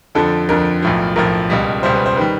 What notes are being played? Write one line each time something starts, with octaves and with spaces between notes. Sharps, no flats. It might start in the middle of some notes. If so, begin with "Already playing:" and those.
F2 D3 F3 A4
F2 D3 F3 A#4
B1 A2 F3
B1 A2 F3 A#4
C#2 B2 G3
C#2 B2 G3 C5
B4
C5
D#3 G3 B4